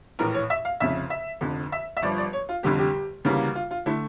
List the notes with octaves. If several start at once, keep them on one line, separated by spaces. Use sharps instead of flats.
A#1 A2 E3 A#4
C#5
E5
F5
F1 F2 C#3 E5
E5
F1 F2 D3
E5
E5
G1 G2 F3 D5
D5
C#5
F4
F1 F2 D3 G3 G4
G4
D2 C#3 E3 G3 A#3
F4
F4
D3 A3 E4